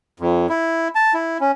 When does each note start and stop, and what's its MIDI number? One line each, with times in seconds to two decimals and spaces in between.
0.20 0.47 41
0.49 0.88 64
0.95 1.14 81
1.14 1.38 64
1.41 1.51 61